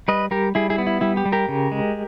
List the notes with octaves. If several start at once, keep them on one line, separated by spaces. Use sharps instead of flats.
G3 B4 D#5
G3 G4 A#4
G3 E4 G#4
E4 G#4
B3
E4
G3 E4
G4
G3
G4 A#4
C#3
G#3